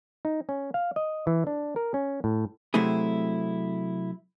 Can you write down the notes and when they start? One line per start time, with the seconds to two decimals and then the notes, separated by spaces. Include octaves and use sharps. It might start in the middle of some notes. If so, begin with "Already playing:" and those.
0.25 D#4
0.49 C#4
0.74 F5
0.96 D#5
1.27 E3
1.47 D4
1.76 A#4
1.94 C#4
2.24 A2
2.74 C3 F#3 A3 C4 E4 G#4